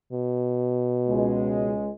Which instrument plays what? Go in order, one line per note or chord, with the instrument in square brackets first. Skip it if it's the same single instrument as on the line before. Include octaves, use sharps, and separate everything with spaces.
[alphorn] B2
[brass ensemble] C#2 G#3